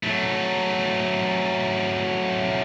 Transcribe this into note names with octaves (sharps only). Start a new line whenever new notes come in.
F#3 A3